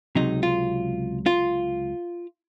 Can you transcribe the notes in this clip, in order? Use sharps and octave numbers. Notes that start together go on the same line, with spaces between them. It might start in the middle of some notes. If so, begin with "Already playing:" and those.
C#2 C3 F#3 D#4
F4
F4